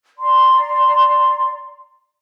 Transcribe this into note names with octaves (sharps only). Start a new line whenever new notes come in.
D5 A#5 C6